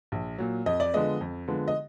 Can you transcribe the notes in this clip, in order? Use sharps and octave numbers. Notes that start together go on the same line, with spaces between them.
A#1
A#2 F#3
F2 D#5
D5
D3 F3 G#3 B3 D#5
F2
D3 F3 G#3 B3
D#5